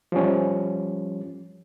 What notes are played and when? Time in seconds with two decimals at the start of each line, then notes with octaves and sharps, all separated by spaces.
0.12 F3 G3 C#4